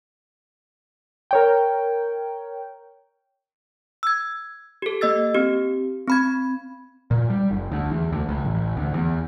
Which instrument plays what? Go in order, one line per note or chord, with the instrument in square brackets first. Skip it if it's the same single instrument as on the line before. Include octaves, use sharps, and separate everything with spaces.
[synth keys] A#4 C#5 G5
[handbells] E6 G#6
G4 A4
A#3 D#5 E6 A6
C4 G4
C4 B5 G#6
[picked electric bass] A#2
G3
F#1
D2
E2
D2
C#2
A1
D2
E2